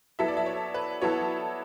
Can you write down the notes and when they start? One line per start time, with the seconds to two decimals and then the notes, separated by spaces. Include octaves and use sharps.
0.19 F#3 B3 E4 A4 E5
0.28 D5
0.37 E5
0.46 C#5
0.74 B4
1.02 F#3 B3 E4 A4 C#5